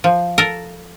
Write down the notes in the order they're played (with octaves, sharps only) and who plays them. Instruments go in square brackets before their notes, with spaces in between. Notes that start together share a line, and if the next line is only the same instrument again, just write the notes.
[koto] F3
A4 A#4